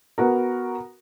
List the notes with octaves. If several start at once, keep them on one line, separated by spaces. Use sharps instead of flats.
B3 F#4 A#4